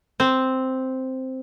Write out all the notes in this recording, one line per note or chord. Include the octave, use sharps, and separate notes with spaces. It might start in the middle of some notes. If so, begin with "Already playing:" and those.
C4